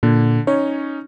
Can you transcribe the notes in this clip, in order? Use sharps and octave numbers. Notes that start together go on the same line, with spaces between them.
A#2 D3
C#4 D#4 C#5